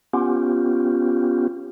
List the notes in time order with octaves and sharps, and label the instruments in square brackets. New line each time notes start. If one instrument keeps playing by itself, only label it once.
[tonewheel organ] B3 C#4 F4 G4